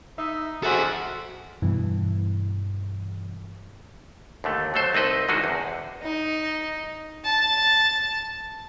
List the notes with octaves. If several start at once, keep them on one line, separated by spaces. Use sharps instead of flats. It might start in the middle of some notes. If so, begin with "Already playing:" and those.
D#4 E5
F#4 G#4 A4 C5 E5 F#5
G2 B2 E3
D#2 D3 A3
F#3 A3 A4 C5
C2 C4 D#4 B4 D#5
D3 D#3 G#3 D#4 F#4 G#4
E2
D#4
A5